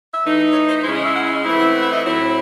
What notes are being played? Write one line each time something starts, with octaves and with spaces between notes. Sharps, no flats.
E5
E3 A3 D#4
C#5
C5
C#3 G#3 C#4 E4 C5
D#5
E5
F#5
E5
D#5
E3 A3 C4 E4
F#5
F#5
E5
D#5
E5
A2 F#3 C4 E4